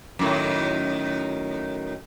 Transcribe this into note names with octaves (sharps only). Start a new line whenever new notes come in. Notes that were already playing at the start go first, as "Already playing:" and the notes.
F#2 A2 D#3